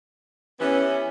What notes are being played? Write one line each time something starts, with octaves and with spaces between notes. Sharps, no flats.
E3 B3 C#4 G4